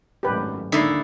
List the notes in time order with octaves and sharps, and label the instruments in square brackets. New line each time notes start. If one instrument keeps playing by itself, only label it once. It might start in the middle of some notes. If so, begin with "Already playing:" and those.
[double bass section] G#1 F#2 A2 [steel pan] G4 B4
[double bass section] D#2 G#3 A#3 [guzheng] D3 E4 [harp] D#4 A6 C7